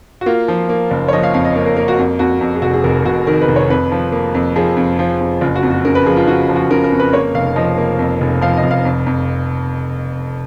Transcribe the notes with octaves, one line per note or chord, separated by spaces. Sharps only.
F#4
A#3 F4
F3
A#3
F#1
C#5
F3 D#5
F5
F2 F5
D#5
A#3
A#4
A#3 A#4
F#4
F2
F2 F#4
F2
G#4
F1 F#4
G#4
F1 A#4
F1 F#4
D#3 A#4
B4
F1
C#5
F2 B4
F3
A#3
F2
F3 G#4
F2
F3
F2
F#1 F4
F#4
F2
F#4
C#3 A#4
B4
F3 G#4
F4
C#3 F#4
F3
F#4
C#3 A#4
A#4
F2
B4
A#3 C#5
F1 F5
F3 D#5
A#3
F2
F1
F3 F5
D#5
F1
F5
F2
F2